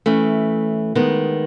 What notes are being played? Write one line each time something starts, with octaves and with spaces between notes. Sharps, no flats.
E3 A3 C#4
D#3 G#3 B3